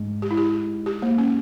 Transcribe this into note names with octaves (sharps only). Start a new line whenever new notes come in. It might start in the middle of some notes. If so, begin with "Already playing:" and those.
Already playing: G#2
G4
E4
G4
G4
A#3
C#4